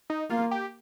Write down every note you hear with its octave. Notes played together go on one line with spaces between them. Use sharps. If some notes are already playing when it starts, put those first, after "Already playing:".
D#4
A#3 F4
G4